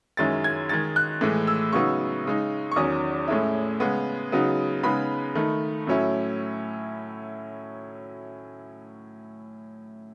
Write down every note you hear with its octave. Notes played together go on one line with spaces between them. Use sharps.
F#2 D#3 G#3 C#4 E4 A6
G#6
D#3 G#3 D#4 A6
F#6
A2 E3 G#3
E6
C#3 F#3 B3 D#4 C#6
C#3 G#3 D#4
C#6
E2 D#3 F#3 C#4 D#6
A2 G#3 C#4 E4
C#3 G#3 B3
C#3 F#3 B3 D#4
C#3 G#3 B3 D#4 B5
D#3 A3 D#4
A2 F#3 C#4 E4